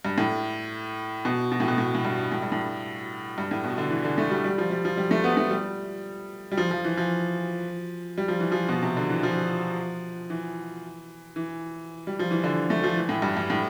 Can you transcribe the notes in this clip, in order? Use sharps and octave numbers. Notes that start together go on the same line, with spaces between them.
G2
A2
B2
B2
A2
B2
A2
A2
G2
A2
G2
A2
G2
A2
B2
D3
E3
D3
A3
G3
G3
F3
G3
F3
G3
A3
B3
A3
G3
G3
F3
F3
E3
F3
G3
F3
E3
F3
B2
C3
D3
E3
F3
E3
E3
G3
F3
E3
D3
A3
F3
E3
A2
G2
G2
A2